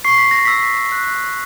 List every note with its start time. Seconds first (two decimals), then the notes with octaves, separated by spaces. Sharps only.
0.04 C#6 C7
0.18 B6
0.31 A#6
0.45 E6 B6
0.92 F#6